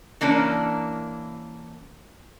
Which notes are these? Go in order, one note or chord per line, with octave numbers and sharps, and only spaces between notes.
E3 A#3 C#4 D4 A#4